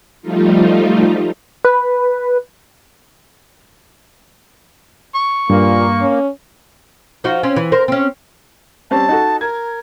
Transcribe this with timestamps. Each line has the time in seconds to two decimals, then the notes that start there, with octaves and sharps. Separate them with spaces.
0.22 F3 G3 A3 D#4 F4
1.65 B4
5.15 C#6
5.50 G2 A#2 A#3
6.01 C#4
7.24 F3 D#4 F#4
7.43 C4 C#4
7.56 E3
7.72 A#4 C5
7.88 C4 C#4
8.91 G3 C4 C#4 A5
9.09 D#4 F#4 A4
9.41 A#4 G#6